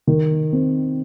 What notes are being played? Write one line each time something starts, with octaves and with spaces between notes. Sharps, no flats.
D#3
C4